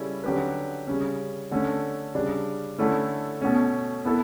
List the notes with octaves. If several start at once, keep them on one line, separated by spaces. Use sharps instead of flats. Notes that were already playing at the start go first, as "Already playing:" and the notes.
Already playing: C#3 G3 C#4 E4 A4
D3 F#3 C#4 G4 B4
C#3 G3 C#4
D3 A3 C#4
C#3 G3 D4
D3 A3 C#4 E4
B2 A3 C#4
B3 E4 A4